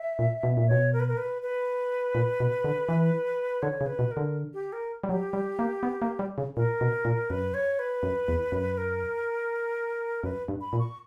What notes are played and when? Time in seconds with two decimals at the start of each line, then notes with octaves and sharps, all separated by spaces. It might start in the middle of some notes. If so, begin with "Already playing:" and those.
Already playing: E5
0.19 A#2
0.43 B2
0.57 A#2
0.68 B2 C#5
0.93 A#4
1.00 B4
1.08 A#4
1.17 B4
1.42 B4
2.15 A#2
2.40 B2
2.64 D3
2.89 E3
3.62 D3 C#5
3.81 C#3
3.86 B4
3.99 B2
4.11 A#4
4.17 D3
4.54 G4
4.73 A#4
5.04 G3
5.09 F#3 G4
5.33 G3
5.59 A#3
5.83 B3
6.02 A#3
6.19 G3
6.38 C#3
6.57 A#2 A#4
6.81 B2
7.05 A#2
7.30 F#2 B4
7.54 C#5
7.79 B4
8.03 F#2
8.28 E2
8.52 F#2
8.77 A#4
10.24 F#2 B4
10.48 G2
10.61 B5
10.73 A#2
10.79 C#6